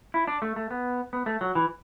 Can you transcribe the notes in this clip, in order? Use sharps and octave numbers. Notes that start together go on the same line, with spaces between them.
E4
D4
A3
A3
B3
B3
A3
F#3
E3